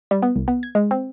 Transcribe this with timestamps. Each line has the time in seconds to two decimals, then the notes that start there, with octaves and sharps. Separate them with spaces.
0.11 G3
0.22 B3
0.36 C2
0.48 B3
0.63 G#6
0.75 G#3
0.91 C4